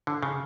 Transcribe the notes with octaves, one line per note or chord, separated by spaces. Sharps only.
D3
C#3